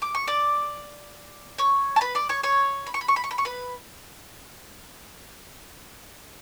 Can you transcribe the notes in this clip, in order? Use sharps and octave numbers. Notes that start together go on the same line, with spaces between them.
D6
C#6
D5 D6
C#5 C#6
A5
B4 B5
D5 D6
C#5 C#6
C#5 C#6
B5
C#6
B5
C#6
B5
C#6
B5
C#6
B4 B5